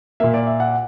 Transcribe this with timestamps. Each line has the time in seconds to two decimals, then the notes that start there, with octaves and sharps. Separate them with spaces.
0.20 A#2 A#3 E5
0.34 D5
0.47 E5
0.60 F#5